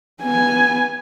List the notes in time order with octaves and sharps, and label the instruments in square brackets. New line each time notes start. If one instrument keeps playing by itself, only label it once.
[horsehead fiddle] B3 G#5